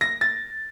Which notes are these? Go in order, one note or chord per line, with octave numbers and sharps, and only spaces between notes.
A#6
A6